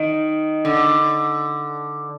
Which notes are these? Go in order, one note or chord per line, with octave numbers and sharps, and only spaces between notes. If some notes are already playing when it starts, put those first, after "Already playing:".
Already playing: D#3
D3